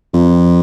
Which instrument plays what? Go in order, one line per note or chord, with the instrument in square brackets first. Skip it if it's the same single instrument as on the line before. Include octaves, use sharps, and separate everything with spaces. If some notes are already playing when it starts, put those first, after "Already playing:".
[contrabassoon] F2